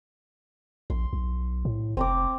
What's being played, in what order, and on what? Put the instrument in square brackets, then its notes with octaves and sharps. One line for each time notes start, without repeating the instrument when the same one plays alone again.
[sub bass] A#1 [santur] C6
[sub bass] B1
A2
[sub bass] F1 [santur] C4 A#5 D6